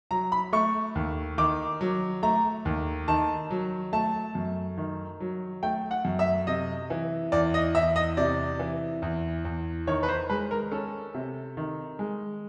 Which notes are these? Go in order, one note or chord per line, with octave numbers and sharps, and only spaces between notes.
F#3 A#5
B5
A3 C#6
D#2
D#3 D6
F#3
A3 A#5
D#2
D#3 A5
F#3
A3 A5
F#2
D#3
F#3
A3 G5
F#5
F#2
E5
C3 D#5
E3
E2 D5
D#5
E2 E5
D#5
C3 D5
E3
E2
E2
D#3 C#5
B4
C5
G#3 B4
A#4
C#4 A4
C3
D#3
G#3